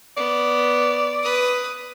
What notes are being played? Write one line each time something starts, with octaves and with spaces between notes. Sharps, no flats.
B3 D5
B4 D#6